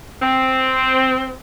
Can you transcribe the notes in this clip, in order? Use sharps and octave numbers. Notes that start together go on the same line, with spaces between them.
C4